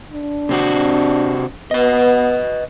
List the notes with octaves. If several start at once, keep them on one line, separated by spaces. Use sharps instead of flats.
D4
C3 C4 F#4
B3 B4 D#5